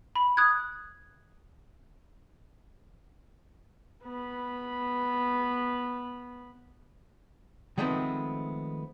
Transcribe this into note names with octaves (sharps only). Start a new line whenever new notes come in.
B5
D#6 F#6 G#6
B3 B5
D#3 F3 G#3 A3 B3 C4